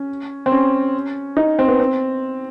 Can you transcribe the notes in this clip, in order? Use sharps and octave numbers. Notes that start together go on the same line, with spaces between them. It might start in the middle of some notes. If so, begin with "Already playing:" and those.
Already playing: C#4
C4
C#4
D#4
C4
B3
C4